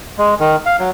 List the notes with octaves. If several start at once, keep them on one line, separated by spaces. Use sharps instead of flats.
G#3
D#3
F5
F#3